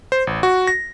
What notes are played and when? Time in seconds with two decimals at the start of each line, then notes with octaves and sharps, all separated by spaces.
0.12 C5
0.27 A1
0.43 F#4
0.67 A#6